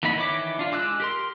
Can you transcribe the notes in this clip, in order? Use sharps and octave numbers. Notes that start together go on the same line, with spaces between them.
E3 A#3 B3 D#4 B5
D#3 E3 E4 C#5 D6
D4 F4
G#3 D6 E6 F#6
G4 A#4 C6